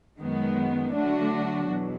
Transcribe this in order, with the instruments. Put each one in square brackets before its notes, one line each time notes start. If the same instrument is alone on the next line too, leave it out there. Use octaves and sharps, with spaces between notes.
[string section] F#2 D#3 G#3 B3
D3 F#3 A3 D4 F#4
E2 B2 F#3